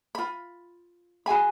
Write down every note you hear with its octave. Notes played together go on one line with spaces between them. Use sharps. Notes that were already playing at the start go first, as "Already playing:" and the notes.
F4 B5
F#4 G#4 G#5 B5